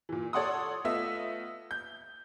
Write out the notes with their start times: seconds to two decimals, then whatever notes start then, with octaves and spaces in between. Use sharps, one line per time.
0.09 A#2 E3
0.33 A4 C#5 D5 F#5 C6 D#6
0.85 A3 B3 F4 D#5 E5
1.71 G6